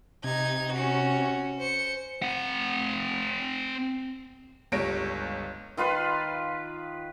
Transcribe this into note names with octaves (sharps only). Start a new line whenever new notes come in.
C3 D#4 G#6
C#4 F#4
C5 C#7
C4 F#5
G1 C#2 G3 C#5 A#6 D7
D#3 F4 B4 C6